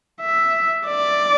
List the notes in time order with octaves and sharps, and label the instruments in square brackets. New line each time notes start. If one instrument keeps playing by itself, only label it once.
[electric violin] E5
D5